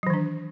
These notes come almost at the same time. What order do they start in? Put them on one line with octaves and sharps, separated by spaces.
F#3 E3 D#3 D4